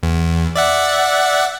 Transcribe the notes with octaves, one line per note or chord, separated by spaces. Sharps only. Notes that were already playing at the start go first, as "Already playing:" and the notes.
E2
D5 E5 F#5